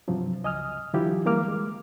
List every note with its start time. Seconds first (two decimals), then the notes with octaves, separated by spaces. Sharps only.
0.08 G2 C3 F3 F#3
0.44 C#2 D#5 G#5 D#6 F6
0.93 D3 E3 F#3 E4 F4 G4
1.25 E3 G3 G#3 A#3 D6 F6
1.48 G#3